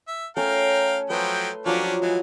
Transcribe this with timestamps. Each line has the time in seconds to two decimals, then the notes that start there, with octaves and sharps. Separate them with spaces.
0.08 E5
0.37 A3 C#4 A4 A#4 F5 G5
1.10 F3 F#3 A3 B4 G5 C6
1.66 F3 F#3 C#4 D4 G4 A#5
2.02 E3 G#3 F#5